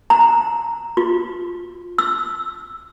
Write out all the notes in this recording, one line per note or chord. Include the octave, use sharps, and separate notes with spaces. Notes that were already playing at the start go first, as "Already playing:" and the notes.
A#5
F4
E6